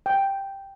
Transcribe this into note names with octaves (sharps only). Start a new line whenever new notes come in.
G5